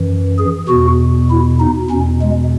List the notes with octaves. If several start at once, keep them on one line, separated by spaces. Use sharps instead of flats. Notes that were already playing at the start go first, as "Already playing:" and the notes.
Already playing: F#2 E3
G#4
E2 B2 F#4
E4
D#4
E2 B2 C#4
G#3